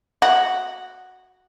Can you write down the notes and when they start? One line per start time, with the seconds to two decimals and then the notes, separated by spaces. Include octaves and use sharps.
0.22 F#4